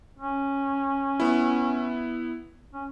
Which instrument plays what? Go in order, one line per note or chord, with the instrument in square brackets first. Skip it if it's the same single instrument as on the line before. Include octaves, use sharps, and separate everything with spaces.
[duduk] C#4
[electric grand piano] B3 E4
[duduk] C#4